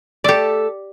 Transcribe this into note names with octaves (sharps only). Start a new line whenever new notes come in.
A3 G4 A4 D5